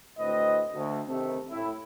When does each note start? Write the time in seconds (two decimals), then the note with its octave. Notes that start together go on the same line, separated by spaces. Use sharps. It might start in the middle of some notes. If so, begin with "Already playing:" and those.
0.19 D2 A2 C4 B4 D#5
0.73 D2
1.08 C3 D#3 A3
1.51 A2 E4